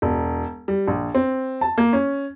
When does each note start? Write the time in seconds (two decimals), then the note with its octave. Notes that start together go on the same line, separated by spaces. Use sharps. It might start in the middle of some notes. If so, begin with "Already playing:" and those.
0.02 E1
0.68 G3
0.88 A#1
1.15 C4
1.61 A5
1.78 A#3
1.93 C#4